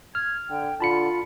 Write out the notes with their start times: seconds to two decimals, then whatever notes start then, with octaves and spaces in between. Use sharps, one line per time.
0.15 F6 G#6
0.50 D3 G5
0.80 D3 F4 A5 B5 C#7